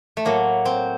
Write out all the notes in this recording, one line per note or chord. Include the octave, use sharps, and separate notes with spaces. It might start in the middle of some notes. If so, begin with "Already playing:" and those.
A3
A2 F#3 A#3
C4